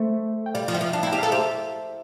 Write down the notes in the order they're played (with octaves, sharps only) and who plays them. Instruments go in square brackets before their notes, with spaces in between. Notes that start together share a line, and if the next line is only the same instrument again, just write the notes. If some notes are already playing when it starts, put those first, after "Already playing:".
Already playing: [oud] A3 [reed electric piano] C5 E5
[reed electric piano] G5
[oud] G3 [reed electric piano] D5 F5
[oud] F3
[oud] G3 [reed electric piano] E5 G5
[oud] F3
[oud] D4 [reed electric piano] F5 A5
[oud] E4
[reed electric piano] G5 A#5
[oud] G4
[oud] A4 [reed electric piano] F5 A5
[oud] G4 [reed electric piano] C5 E5